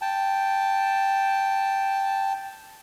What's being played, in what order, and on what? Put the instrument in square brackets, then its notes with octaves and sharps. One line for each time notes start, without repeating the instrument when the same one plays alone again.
[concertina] G5 A5